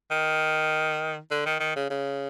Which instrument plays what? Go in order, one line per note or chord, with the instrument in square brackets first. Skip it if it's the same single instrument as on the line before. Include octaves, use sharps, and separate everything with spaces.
[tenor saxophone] D#3
D3
D#3
D#3
C#3
C#3